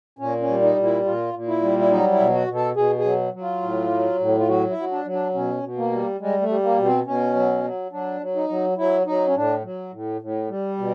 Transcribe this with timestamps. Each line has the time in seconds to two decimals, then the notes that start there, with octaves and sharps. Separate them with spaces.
0.19 A#2 C#4
0.40 C#4
0.47 G3
0.62 D#4
0.76 A#2
0.83 E4
1.05 A#2 F4
1.34 A#2
1.48 E4
1.62 G3
1.79 E4
1.91 F#3 D#4
2.12 E4
2.19 B2
2.34 F#4
2.48 B2
2.55 A4
2.76 B2 G#4
2.99 G#4
3.05 F#3
3.34 F#3
3.41 F4
3.62 A2
3.91 F#3
4.20 A2
4.39 F4
4.48 F#3 F#4
4.70 E4
4.77 F#3
4.91 D4
5.05 F#3
5.13 D4
5.34 B2 C#4
5.63 B2
5.77 A#3
5.92 G3
6.20 G3 G#3
6.41 A3
6.49 G3
6.63 A#3
6.78 B2
6.85 C4
7.06 B2 C#4
7.35 F#3
7.63 F#3
7.92 F#3 D4
8.21 F#3
8.35 D#4
8.49 F#3
8.77 F#3 E4
9.06 F#3 D#4
9.27 C#4
9.35 A2 D4
9.64 F#3
9.92 A2
10.21 A2
10.49 G3
10.78 B2